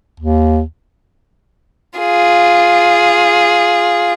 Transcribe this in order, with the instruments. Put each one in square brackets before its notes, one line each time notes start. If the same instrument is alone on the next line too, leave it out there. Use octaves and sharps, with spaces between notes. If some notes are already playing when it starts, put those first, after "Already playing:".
[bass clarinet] D#2
[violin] F4 G#4